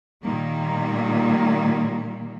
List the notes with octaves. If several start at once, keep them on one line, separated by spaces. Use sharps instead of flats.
A#2 D#3 G3 A#3